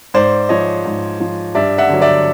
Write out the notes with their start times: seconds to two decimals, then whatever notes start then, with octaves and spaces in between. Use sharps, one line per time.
0.14 G#2 C5 D5
0.49 F3 C#5 D#5
0.85 G#2
1.20 F3
1.55 G2 D5 E5
1.78 E5 F#5
1.89 D3 F#3
2.01 D5 E5